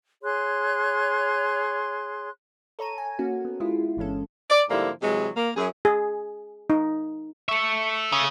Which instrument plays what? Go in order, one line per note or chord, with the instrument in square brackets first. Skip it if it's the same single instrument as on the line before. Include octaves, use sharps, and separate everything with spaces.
[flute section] G#4 C#5 C6 F#6
[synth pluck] A4 C#5 A#5 D#7
G#5
A#3 C#4 F#4
B3
G#3 E4 F4
G1 E3 G#3 C#4 A4
[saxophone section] D5
G#2 D3 F3 G3 A#3 E4
C3 E3 F#3 G#3
A#3
F#2 G#4
[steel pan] G#4
D#4
[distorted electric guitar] A4 E5 [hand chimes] C#6 C#7
[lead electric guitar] C#3 [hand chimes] D#6